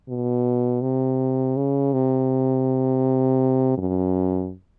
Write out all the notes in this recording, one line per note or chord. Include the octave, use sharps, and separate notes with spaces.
B2
C3
C#3
C3
F#2